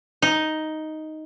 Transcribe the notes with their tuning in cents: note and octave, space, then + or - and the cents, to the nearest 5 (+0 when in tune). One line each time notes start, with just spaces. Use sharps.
D#4 +5